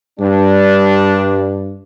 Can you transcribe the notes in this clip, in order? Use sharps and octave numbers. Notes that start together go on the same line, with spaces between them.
G2 G3 D4